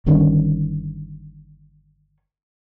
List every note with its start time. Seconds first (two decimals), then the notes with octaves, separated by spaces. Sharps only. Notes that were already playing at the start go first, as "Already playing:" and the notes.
0.06 G1 G2 D#3 C#4